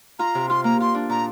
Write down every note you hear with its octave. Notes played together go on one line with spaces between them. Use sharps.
F4 A#5
C3
F4 C6
A#3 A#5
F4 C6
D4
A#2 A#5